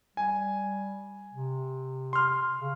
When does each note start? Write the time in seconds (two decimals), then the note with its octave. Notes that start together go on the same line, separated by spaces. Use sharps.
0.17 G3 G#5
1.33 C3
2.13 C6 F6
2.60 C#3